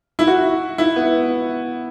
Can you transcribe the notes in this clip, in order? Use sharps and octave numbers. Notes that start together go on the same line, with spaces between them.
E4
F#4
E4
B3